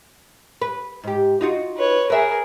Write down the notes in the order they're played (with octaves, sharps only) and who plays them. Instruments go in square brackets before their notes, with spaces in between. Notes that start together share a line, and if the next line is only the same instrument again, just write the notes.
[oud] B4
G#2 G4
D#4 F4 F#4
[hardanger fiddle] B4 C#5
[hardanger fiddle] G#4 A#4 [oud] B4 E5